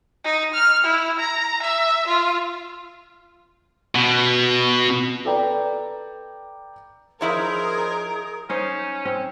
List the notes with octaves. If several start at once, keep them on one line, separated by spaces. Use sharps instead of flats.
D#4
F6
E4
A#5
E5
F4
B2
A4 B4 D5 G5 A#5
F3 D#4 E4 G#4 A#4 C5 C#5
C#4 D#4 C5
C4 C#4